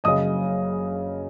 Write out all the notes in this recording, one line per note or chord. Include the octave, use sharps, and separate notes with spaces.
F#1 F#2 C#3 D#5 D#6